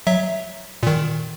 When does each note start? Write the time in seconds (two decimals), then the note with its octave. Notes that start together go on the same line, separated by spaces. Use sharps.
0.07 F#3 E5
0.83 A#2 D#3